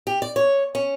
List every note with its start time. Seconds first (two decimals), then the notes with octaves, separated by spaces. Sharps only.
0.07 G4
0.22 D5
0.36 C#5
0.75 C#4